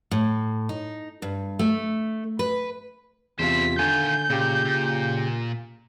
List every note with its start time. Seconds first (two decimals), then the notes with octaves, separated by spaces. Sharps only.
0.11 A2
0.69 D#4
1.22 G2
1.59 A3
2.39 B4
3.39 E2 C3 E4 F4 C5 B6
3.79 D3 D#3 F4 G#5 G6
4.30 A#2 C#3 G4
4.65 A#2